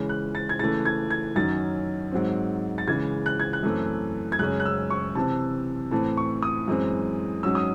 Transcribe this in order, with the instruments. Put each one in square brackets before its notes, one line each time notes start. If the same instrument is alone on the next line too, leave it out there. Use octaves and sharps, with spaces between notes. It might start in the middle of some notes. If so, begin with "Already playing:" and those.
Already playing: [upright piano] C#3 E3 G#3 C#4
F#6
A6
G#6
C#3 E3 A3 A6
G#6
G#6
F#2 D#3 F#3 C#4 A6
G#2 F#3 C4
A6
C#3 E3 G#3 G#6
F#6
G#6
F#6
F#2 E3 A3 C4
G#6
F#2 C#3 G#3 C#4 F#6
F#6
E6
C#6
C3 E3 C4 A5
A2 E3 C4 A5
C#6
D#6
F#2 E3 G#3 C4
G#2 F#3 C#4 E6
D#6